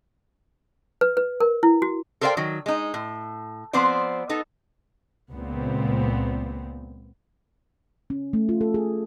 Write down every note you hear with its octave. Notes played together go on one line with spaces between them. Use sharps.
B4
B4
A#4
E4
F#4
A4 A#4 C5 D5 F5 G5
D#3 F#3
G#3 D#4
A2
F3 B3 C4 B4 C5 D5
B3 D#4 A4
C#2 A#2 B3 C4
C#4
A3
F4
A4
G#4